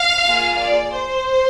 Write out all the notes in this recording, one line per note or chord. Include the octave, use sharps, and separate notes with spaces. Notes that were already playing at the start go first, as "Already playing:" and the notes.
Already playing: F5
A#3 F4 G#4
D5
C5